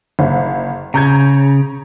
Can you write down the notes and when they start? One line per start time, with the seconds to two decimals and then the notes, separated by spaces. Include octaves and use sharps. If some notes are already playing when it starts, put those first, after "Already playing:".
0.19 F#1
0.94 C#3 A#5 G6 G#6